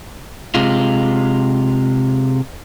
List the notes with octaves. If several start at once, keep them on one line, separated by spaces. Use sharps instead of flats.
C3 G#3 F4